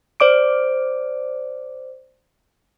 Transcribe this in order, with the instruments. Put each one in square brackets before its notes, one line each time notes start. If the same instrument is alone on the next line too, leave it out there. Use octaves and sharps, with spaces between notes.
[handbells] C5 D5 D6 D7